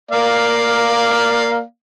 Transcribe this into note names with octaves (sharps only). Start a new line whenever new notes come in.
A#3 D5 F5